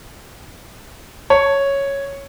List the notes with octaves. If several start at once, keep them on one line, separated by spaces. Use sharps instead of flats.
C#5